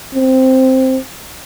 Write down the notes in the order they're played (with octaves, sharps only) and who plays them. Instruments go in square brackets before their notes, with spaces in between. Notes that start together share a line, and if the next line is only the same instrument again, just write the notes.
[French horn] C4